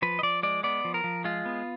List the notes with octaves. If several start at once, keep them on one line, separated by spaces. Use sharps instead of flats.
F3 B4
D#5
F3 D5
G#3 D5
B3 D5
F3
A#4
F3
G#3 F4
B3